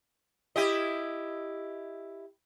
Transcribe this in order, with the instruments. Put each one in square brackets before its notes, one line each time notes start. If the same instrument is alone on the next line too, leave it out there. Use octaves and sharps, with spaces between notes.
[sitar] E4 G4 D#5